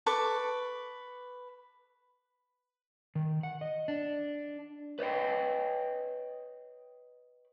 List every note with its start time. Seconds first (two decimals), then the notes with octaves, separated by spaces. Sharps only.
0.06 A4 B4 C#6 D6
3.15 D#3
3.43 F#5
3.61 D#5
3.88 D4
4.99 B4 C#5 D#5 G5